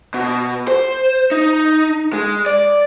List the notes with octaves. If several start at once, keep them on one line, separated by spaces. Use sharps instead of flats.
B2
C5
D#4
G#3
D5